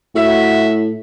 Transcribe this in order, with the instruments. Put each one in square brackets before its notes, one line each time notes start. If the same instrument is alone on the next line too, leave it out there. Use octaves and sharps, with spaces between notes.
[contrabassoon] A2 [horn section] F#4 E5